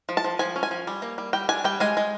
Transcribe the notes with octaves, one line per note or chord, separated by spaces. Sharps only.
F3
A5
F3
F3 G#5
C#4
G#5
F3
G3
A#3
G3
G3 G5
D4 G#5
G3 G5
G#3 G#5
G#3